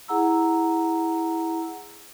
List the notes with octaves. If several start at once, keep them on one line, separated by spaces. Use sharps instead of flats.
E4 G#4 F#5 A#5 E6